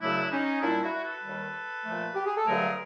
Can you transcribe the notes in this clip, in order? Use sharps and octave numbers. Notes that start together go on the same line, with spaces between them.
F#2 C#3 F#3 A3 D4 E4
C#4 D#4
A#2 G3 D4 E4
E4 F#4
A4 B4
D#2 D#3 G3
A#2 F3 A3
G4
G#4
A4
G2 D3 F#3 A3 G#4 A#4